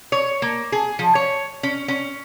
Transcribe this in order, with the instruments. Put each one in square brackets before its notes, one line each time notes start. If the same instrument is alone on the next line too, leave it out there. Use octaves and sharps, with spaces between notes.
[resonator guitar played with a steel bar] C#5
A#3
G#4
F3
C#5
C#4
C#4